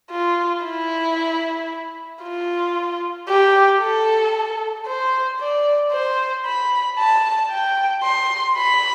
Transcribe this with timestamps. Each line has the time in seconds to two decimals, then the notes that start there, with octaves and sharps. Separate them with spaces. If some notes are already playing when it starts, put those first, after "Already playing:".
0.11 F4
0.65 E4
2.23 F4
3.28 G4
3.81 A4
4.87 C5
5.40 D5
5.92 C5
6.46 B5
6.99 A5
7.51 G5
8.04 C6
8.57 B5